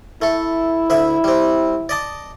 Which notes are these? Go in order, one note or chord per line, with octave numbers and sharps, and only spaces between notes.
A3 E4 A4
D2 E5 B5
G3 C4
D5 D#5 A5